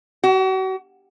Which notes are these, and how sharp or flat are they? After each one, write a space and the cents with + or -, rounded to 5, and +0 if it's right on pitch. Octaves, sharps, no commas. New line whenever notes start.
F#4 +40